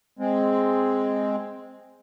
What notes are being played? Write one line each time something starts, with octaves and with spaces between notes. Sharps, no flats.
G#3 C4